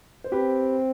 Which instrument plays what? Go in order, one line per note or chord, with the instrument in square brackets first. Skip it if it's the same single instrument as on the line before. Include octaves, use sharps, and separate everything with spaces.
[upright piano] C5
[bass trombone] C4 [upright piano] G4 B4